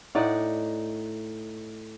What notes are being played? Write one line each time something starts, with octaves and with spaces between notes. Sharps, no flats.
A2 D#4 D5 F#5